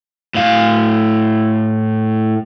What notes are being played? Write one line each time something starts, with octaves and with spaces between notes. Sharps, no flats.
A2 F5